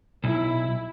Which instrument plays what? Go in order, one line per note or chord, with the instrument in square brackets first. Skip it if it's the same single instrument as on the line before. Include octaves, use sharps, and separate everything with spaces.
[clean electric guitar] B1 [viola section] E4